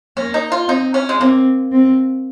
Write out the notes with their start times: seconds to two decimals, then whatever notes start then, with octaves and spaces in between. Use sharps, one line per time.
0.17 A#3 C#4
0.34 D#4
0.52 F4
0.68 C4 D#4
0.94 C#4
1.09 G#3
1.20 A#3 C4
1.72 C4